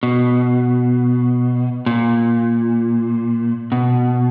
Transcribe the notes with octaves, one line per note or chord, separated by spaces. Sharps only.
B2
A#2
B2